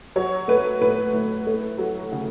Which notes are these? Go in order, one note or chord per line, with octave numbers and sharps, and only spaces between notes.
F#3 C#5
A3 B4
A2 B4
A2
A3
F#3
C#3